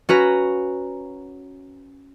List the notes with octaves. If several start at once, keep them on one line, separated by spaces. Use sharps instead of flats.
C#4 F#4 B4 A#5